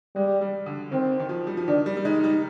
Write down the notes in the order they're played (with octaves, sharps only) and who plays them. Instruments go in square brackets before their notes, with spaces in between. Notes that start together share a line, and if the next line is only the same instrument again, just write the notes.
[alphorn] G3 [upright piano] G#3
[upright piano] G3
D3
[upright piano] D#3 [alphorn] C4
[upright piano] D#3
F3
G3
F3
[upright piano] D#3 [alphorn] D4
[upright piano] G3
G3
[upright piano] G#3 [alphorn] D#4
[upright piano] G3